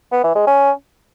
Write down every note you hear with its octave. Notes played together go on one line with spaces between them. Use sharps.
B3
E3
G#3
C#4